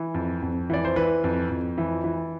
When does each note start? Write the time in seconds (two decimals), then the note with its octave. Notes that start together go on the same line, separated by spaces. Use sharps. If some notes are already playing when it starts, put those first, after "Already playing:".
Already playing: E3
0.14 F2
0.42 F2
0.70 E3 D5
0.85 C5
0.96 E3 B4
1.24 F2
1.50 F2
1.78 E3
2.04 E3